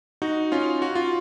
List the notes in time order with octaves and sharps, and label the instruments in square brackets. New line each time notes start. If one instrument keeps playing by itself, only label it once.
[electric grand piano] D#4 F#4
C#4 F4
F#4
F4